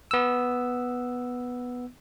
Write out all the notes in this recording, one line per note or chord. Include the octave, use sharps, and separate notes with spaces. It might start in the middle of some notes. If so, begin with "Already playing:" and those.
B3 E6